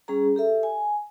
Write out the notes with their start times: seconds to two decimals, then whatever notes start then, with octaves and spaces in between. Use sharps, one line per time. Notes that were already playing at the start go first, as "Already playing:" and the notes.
0.08 G3 C#4 G#4 A#5
0.36 G4 A4 E5
0.63 G#5